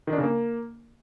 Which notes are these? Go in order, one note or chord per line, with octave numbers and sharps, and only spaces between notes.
D#3
D4
C#3
A#3